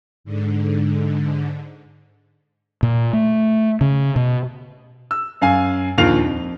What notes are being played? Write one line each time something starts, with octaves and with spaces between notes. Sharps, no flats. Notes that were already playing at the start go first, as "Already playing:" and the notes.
G#2 D3
A#2
A3
C#3
B2
E6
F#2 F5 G#5
A#1 D#2 F4 A#4 F5 F7
F2